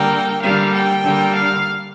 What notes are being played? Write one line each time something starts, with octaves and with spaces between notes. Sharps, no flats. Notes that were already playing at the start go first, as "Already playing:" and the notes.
Already playing: D3 G3 A#3 G5
D3 G3 A#3 F5
G5
D3 G3 A#3
F5